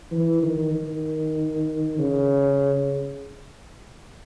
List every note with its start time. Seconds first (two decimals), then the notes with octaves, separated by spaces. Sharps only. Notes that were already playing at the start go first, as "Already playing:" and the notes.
0.12 E3
0.42 D#3
0.74 D#3
1.98 C#3